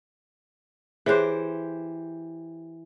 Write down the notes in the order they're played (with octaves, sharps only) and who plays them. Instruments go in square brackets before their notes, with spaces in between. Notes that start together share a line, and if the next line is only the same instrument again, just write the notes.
[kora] E3 G4 C5 [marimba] G#4 C#5 F#6